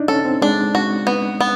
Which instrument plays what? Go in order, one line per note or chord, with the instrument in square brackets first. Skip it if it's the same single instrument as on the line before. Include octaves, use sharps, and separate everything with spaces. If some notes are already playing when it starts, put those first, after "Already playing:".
Already playing: [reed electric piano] D4 D#4
[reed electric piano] C#4 [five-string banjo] A4
[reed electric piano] C4
[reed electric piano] G#3 [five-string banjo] D4
[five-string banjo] F#4
B3
B3